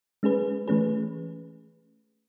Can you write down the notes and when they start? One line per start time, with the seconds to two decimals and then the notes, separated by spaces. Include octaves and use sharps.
0.23 G#3 C#4 G#4 B4
0.68 E3 A3 C#4 G#4 B4